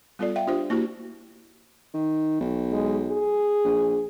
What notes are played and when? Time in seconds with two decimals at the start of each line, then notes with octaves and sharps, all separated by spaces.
0.19 G3 B3 F4 A4 D5
0.36 E5 F5 G5
0.47 D4 F4 G4 C5
0.70 A#3 E4 F#4 G4 C5
1.94 D#3
2.40 B1
2.72 G#3
3.09 G#4
3.64 A#1